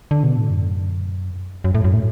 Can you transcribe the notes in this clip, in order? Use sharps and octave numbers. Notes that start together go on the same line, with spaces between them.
D3
B2
A2
F#2
F#2
A2
F#2
A2